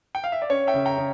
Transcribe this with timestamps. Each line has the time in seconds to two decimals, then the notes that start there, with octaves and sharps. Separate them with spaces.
0.15 G5
0.24 F5
0.32 E5
0.42 D5
0.50 C#4 C#5
0.67 E5 G5
0.74 C#3
0.85 G5 A#5
0.98 C#3